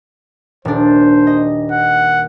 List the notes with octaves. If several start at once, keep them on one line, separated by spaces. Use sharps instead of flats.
D#1 D4 C5
D#5
F#5